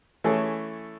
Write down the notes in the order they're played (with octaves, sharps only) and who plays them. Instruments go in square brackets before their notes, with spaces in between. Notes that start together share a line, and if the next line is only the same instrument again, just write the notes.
[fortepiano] E3 A3 C#4 G#4 A4